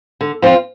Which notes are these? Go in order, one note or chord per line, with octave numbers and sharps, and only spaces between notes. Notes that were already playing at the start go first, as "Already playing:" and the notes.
D3
F3 C4 F4